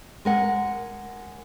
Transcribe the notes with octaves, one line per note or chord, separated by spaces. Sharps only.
G#3 A#4 F#5